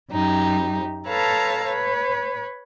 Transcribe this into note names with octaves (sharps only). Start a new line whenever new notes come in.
F#2 D#4 G4
A4 B4 C#5 F5 A5 A#5
B4 C#5